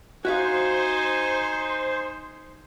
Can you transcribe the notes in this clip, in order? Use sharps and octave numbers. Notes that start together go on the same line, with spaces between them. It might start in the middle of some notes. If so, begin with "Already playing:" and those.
D#4 F#4 C5 E5 F5 G#5